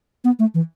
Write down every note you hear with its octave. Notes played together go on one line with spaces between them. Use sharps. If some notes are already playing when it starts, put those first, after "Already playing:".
B3
A3
E3